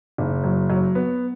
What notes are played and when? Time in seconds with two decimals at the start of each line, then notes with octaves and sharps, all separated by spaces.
0.18 F#1
0.44 F#3
0.70 F#3
0.95 B3